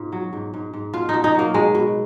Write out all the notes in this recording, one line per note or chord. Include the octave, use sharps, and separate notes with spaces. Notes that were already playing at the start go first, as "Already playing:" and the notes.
Already playing: G#2 B2 F4
F#3
G#2
G#2
G#2
B2 F4
D#4
B2
D#4
F#3 A#3
B2 G#3
B2